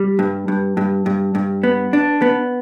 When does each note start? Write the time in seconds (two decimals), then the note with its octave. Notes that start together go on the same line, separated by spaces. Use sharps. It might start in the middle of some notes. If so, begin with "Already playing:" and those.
Already playing: G3
0.19 G2
0.48 G2
0.77 G2
1.06 G2
1.35 G2
1.63 B3
1.93 D4
2.22 B3